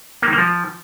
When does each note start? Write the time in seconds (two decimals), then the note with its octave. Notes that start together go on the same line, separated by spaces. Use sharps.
0.22 A#3
0.28 D#3
0.33 A#3
0.38 F3